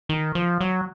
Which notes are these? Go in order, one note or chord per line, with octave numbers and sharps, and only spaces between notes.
D#3
F3
F#3